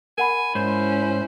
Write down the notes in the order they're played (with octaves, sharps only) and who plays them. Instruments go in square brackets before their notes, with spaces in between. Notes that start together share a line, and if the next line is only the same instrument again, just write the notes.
[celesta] A#4 F#5 B5 [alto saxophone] G#5
[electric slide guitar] G#2 [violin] C#4 E4 [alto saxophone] C5